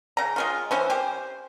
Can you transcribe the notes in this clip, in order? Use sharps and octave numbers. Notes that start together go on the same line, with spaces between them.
C#3 A#5
G#3 C#4 F4
E3 C#4 C5
G4 C5